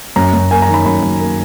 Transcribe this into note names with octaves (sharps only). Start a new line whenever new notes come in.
F#2 A#5
F#2
A#3 G#5
A#5
D#3
B5
F#2 B5
F#2
A#3